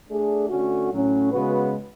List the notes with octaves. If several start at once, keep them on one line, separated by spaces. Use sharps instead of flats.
A3 D4 G#4
D3 A3 C#4 F#4
A2 F#3 C#4
C#3 G#3 B3 F#4 B4